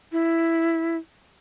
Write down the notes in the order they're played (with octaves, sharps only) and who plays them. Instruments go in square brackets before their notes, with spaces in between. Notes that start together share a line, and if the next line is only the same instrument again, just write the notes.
[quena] E4